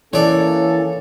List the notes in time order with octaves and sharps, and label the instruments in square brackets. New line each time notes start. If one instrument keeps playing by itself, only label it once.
[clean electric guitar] E3 [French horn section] A#3 C#4 [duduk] A4 [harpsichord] C#5 D5